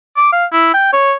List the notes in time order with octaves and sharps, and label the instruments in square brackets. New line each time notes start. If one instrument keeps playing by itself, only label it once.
[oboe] D6
F5
E4
G5
C#5